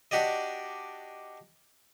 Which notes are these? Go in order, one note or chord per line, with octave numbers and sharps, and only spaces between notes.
D4 F#4 G4 D5 D#5